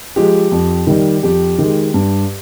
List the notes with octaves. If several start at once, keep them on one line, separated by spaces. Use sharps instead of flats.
F3 G#3 G4
F2
D#3 G3
F2 G4
D#3 G#3
G2